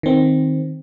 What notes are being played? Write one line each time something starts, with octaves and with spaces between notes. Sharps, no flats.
D#3 C4